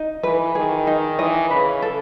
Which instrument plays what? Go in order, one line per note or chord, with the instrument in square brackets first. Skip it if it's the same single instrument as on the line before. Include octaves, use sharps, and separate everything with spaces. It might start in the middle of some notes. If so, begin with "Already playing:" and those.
Already playing: [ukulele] D#4
[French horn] E3 [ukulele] B4
[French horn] D#3 [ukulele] G#4
[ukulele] D#4
[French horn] E3 [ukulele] D#5
[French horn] C#3 [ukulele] B4
[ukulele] A4